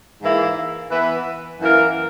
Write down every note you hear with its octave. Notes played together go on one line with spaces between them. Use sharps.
G#2 E3 A#3 E4
E3 B3 E4 B4
F#2 E3 A#3 E4 A#4